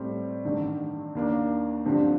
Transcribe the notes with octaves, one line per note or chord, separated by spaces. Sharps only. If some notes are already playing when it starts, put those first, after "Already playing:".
Already playing: A2 G3 C4
A1 G2 D#3
D#2 D#3 A#3 D4
G2 D3 F3 C4 G4